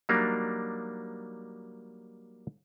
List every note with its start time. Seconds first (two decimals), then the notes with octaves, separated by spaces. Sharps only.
0.09 F#3 G3 A#3 D4 D#4